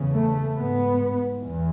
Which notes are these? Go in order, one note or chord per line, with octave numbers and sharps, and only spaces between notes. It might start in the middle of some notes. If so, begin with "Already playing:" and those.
Already playing: E2 C#3
A3
G#2 B3
E2